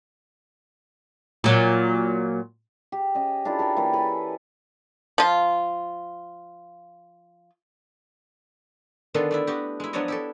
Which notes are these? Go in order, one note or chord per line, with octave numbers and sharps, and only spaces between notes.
A#2 F#3
G4
C#4 D#5
D4 E4 F4 A4
A4 A#4 F5 G5
E3 A#3 G4 C#5
E3 A4 G#5 B5
F3 F4
D3 D#3 B3 D4 F4 A4
A3 D4 E4
B3 F#4 G4
G#3 E4
F3 F#3 B3 D4 C#5 D#5
E4 G4 A4